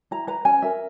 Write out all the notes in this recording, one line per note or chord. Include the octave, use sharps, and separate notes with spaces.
E4 A#5
B4 A#5
C#4 G#5
A#4 E5